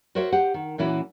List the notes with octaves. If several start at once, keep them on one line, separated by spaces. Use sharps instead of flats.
F#4 A#4 C5 C#5 E5
G4 C5 F#5
D#3
A#2 E3 C#4 E4 F#4